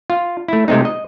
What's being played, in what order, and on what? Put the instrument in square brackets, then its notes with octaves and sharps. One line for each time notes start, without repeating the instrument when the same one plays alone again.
[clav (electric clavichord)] F4
A3 E4
C3 G#3 A3 C4 D#4
D#5